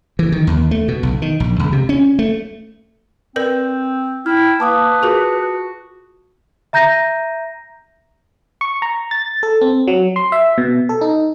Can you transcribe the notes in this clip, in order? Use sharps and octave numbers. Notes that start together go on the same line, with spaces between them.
E3
D#3
D#2
A3
B2
B1
D#3
A#1
C#2
C3
C#4
A3
C4 A#4 B4 D5 G6
E4 G5 F6
A#3 B4 A5 D6 D#6
F4 F#4 G#4 A#4
E5 A#5 G6 A#6 D#7
C#6
A#5
A6
A4
C4
F#3
C6
E5
B2
A4
D#4